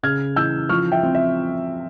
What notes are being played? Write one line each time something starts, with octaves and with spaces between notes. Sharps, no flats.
C#3 F6 G#6
E3 E6 G6
F3 C#6 F6
E5 G5
C4
E5